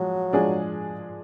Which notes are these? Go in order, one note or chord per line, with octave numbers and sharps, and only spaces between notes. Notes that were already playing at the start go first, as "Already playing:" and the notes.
Already playing: F3 F#3 G#3
F3 G#3 D4 G#4